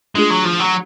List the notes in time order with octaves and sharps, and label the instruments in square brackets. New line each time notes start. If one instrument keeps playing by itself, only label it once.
[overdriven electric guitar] G#3 [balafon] A3 D4 F4 G#4
[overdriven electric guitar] F#3
F3
F#3